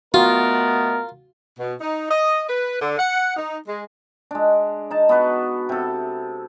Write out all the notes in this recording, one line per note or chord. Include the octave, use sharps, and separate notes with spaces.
B2 A3 B3 F4 F#4 A#4
B2
D#4
D#5
B4
D3
F#5
D#4
G#3
G#3 D4
D#4 A5
B3 F#4 B4
C3 A4